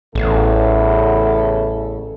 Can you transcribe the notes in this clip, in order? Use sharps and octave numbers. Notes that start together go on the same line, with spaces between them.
A1 E2 C#3 A4